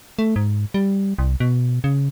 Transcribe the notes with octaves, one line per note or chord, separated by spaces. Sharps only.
A3
G#2
G3
C2
B2
C#3